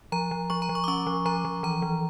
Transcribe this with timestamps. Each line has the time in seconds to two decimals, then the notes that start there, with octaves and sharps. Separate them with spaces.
0.12 F3 A#5
0.31 F3
0.50 F3 C#6
0.62 A#5
0.69 F3
0.75 C#6
0.84 D6
0.88 C#4 C#6
1.07 F3
1.25 F3 A#5
1.45 F3
1.63 E3 A#5
1.82 E3